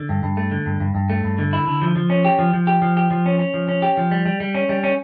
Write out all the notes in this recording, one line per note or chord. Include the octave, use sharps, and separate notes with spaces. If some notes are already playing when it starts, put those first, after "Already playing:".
Already playing: D3
G2
G2
A3
D3
G2
G2
G2
A3
G2
D3
E4
D3
F3
F3
C#4
G4
F3
F3
G4
F3
G4
F3
C#4
C#4
F3
C#4
G4
F3
G3
G3
G3
C#4
G3
C#4